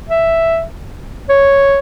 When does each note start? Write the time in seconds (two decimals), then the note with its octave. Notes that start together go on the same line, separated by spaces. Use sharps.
0.09 E5
1.29 C#5